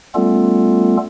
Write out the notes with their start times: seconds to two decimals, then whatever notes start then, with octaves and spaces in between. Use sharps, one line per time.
0.15 G3 A3 B3 C#4 F4 A4